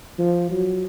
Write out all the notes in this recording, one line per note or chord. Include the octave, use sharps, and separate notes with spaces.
F3
F#3